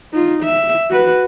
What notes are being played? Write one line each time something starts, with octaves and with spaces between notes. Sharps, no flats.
D#4 F4
E5
F#4 B4